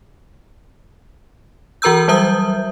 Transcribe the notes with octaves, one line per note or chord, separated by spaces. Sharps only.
E3 F#4 A#4 A#5 E6 G6
F#3 G3 C5 E5 D#6 G6